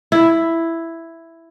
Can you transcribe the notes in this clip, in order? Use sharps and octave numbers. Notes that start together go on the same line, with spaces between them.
E4